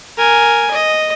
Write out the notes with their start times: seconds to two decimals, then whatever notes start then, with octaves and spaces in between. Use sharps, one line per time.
0.18 A#4 G#5
0.71 D#5